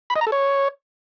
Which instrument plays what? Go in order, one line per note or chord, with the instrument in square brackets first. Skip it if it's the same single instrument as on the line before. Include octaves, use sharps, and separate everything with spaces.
[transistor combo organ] B5
D#5
A#5
A4
C#5